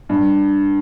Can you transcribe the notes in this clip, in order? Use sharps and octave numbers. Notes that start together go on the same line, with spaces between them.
G2